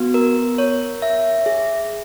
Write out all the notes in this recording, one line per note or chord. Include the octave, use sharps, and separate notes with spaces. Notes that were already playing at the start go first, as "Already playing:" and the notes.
Already playing: B3 F#4
A#4
C#5
E5
G#4